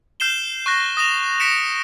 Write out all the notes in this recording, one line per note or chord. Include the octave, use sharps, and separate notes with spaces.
F6 G6 C7 E7 G7
C#6 F#6 A#6
D#6 A#6 E7 F7
A#6 B6 C#7 D7 E7